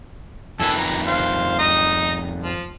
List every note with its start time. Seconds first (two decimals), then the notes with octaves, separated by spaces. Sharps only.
0.59 F2 D#3 A4 B4 G#5
0.78 A#5
1.07 C5 F5
1.59 D#4 D#6
2.43 F3